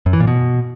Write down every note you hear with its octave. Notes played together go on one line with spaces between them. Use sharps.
F#2
E3
A#2
B2